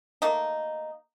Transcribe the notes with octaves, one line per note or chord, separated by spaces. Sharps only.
A3 A#3 D#4